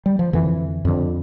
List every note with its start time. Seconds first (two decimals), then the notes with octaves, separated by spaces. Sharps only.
0.06 G3
0.19 F3
0.33 F2 D3 E3
0.85 F2 D3